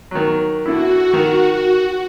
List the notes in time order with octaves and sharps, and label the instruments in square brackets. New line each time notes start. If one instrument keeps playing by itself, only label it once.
[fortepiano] D#3 F#3
[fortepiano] D3 E4 [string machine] F#4
[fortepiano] D#3